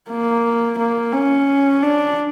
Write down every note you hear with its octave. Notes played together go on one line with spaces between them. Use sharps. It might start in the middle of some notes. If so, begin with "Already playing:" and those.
A#3
A#3
C#4
D4